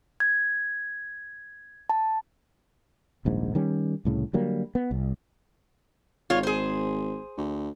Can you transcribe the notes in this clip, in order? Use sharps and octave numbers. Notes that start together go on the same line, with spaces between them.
G#6
A5
D#1 A#1 G#2
D#3 G3 C#4
C2 A2 C#3
D3 F#3 G3 A#3
B3
C2
G#1 F4 C#5
G#4 C5
D2